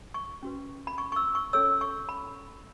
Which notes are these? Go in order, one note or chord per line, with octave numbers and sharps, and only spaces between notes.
C#6
C#4 F#4 B4
B5
C#6
C#6
E6
C#6
C#4 A4 C#5 E6
C#6
B5